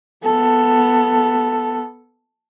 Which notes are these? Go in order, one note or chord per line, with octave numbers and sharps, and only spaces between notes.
B3 A4